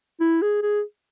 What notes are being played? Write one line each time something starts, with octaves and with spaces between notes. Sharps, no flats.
E4
G#4
G#4